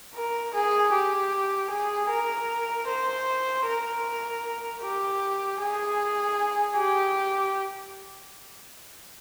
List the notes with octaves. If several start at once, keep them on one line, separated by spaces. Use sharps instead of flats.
A#4
G#4
G4
G#4
A#4
C5
A#4
G4
G#4
G4